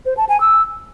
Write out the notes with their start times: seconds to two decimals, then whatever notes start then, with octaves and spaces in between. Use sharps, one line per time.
0.06 C5
0.17 A5
0.29 G#5
0.40 E6